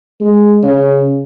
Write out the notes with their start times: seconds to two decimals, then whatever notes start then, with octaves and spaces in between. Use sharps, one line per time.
0.20 G#3
0.63 C#3